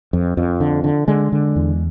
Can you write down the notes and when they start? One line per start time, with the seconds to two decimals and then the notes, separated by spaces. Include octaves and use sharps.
0.13 F2
0.37 F2
0.60 D3
0.84 D3
1.08 D3 G#3
1.32 D3
1.56 E2